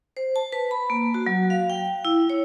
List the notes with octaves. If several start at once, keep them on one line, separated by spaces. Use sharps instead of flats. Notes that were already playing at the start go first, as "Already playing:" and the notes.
C5
A5
B4
B5
A#3
F#4
F#3
F5
G5
E4
C#5